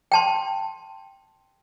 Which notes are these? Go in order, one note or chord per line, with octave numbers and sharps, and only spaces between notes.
G5 A5 C6